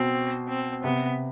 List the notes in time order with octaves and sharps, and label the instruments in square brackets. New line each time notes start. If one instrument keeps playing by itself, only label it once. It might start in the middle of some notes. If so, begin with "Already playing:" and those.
Already playing: [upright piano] B2 [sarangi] C4
[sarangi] C4
[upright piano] C3 [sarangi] B3